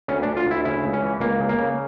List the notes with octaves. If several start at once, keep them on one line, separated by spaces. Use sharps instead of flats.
D2 C#4
D2 D4
F4
D2 E4
C#3 E4
C#2
C#4
E3
C#2 A#3
C#3
A#3
C#3